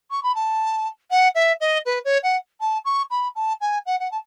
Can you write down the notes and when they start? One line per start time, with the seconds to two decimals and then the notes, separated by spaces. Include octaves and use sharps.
0.11 C#6
0.23 B5
0.35 A5
1.10 F#5
1.35 E5
1.60 D#5
1.85 B4
2.04 C#5
2.23 F#5
2.60 A5
2.85 C#6
3.10 B5
3.35 A5
3.61 G#5
3.86 F#5
4.00 F#5
4.11 A5